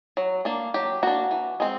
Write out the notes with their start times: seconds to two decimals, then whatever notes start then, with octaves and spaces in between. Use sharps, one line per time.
0.17 F#3
0.45 A#3 D4
0.74 F#3 G4
1.03 A#3 D4 F#4
1.31 E3
1.60 G#3 C4